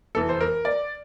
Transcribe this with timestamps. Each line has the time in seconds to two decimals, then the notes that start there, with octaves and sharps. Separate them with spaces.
0.15 F1 E2 E3 A4
0.29 C5
0.41 A#4
0.65 D5